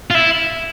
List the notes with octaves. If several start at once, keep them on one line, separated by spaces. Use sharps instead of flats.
F4
E4